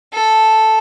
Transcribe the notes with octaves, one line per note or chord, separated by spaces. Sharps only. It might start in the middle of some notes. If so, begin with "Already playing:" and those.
A4